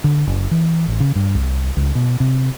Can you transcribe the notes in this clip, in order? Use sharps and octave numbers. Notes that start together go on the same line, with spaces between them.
D3
F#1
E3
A1
C#3
G2
C2
C#2
B2
C3